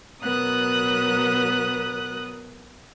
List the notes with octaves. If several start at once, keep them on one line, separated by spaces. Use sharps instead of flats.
B2 F#3 B3 A#4 D#6 F#6